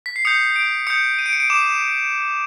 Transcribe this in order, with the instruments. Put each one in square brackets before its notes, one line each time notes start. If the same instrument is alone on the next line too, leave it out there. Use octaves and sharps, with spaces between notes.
[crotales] B6
C7
D#6 G6 C#7
D7
D#6 G6 C#7
D#7
D7
C#7
D7
D6 E7